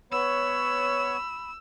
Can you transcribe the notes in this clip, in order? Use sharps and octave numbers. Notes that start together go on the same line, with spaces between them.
B3 C#5 B5 E6